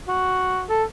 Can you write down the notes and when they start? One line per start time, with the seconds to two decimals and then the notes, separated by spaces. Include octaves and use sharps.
0.08 F#4
0.69 A4